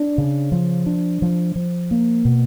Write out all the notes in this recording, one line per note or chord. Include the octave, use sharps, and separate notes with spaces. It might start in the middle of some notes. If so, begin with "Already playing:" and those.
Already playing: D4
C#3
F3
D4
F3
F3
A#3
B2